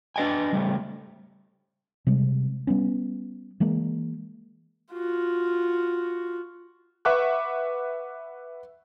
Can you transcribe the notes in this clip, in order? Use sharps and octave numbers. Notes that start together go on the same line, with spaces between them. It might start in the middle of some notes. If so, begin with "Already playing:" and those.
D4 B4 D#5 G5 G#5
C#3 G3 A3
C3 G3 G#3
G3 B3 C#4
E3 G#3 A#3
F4 F#4
B4 E5 F#5 C#6 D6 F#6